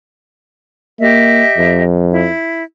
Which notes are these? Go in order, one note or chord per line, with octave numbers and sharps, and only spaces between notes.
A#3 G4 D#5 E5
F2
E4